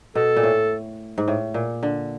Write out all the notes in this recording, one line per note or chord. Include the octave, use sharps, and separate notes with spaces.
B2 A4
A#2
A2
G#2
A2
A#2
D3